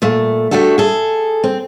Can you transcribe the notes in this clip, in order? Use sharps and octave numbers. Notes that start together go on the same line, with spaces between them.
A#2 A3
A3 D4 F#4 G4 A4
G#4 A4
C4